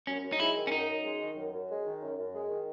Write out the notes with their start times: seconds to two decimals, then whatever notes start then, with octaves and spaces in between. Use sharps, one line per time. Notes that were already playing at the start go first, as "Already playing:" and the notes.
0.07 F#2 C#4
0.23 F#2
0.32 D#4
0.39 G#3 E4
0.56 D#3
0.67 C#4
0.71 F#2 D#4
0.88 F#2
1.04 G#3
1.21 D#3
1.36 F#2
1.53 F#2
1.69 G#3
1.85 D#3
2.01 F#2
2.18 F#2
2.34 G#3
2.50 D#3